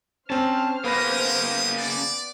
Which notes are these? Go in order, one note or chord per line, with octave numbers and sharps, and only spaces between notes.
C4 C#4 C5 A5 F6
C#3 A#3 B3 G4 B4 G5 D#6 A#6
D5